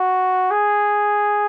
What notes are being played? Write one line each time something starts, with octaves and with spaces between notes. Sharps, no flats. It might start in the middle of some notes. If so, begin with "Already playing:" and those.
Already playing: F#4
G#4